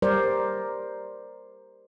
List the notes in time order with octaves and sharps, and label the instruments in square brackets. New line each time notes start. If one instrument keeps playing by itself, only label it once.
[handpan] G3 A#4 C5 D5